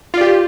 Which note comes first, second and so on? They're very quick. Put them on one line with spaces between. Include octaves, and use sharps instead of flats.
F4 D5 G4